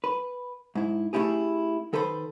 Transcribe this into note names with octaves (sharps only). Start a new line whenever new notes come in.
B4
G#2 E4
A3 C#4 E4 G4 G#4
D#3 A4 B4 C5 B5